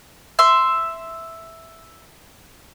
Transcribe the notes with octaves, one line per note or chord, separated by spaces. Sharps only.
E5 C6